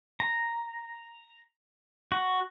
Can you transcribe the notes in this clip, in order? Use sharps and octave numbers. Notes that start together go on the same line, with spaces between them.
A#5
F#4